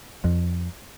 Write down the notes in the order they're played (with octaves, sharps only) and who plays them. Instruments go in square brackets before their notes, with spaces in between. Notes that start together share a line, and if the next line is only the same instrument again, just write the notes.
[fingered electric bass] F2